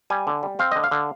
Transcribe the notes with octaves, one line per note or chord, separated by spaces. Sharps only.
G3 G#5
D3
G3
C4 F5
D3 D#5
F5
D3